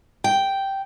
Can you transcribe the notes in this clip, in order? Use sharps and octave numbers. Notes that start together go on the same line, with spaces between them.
G5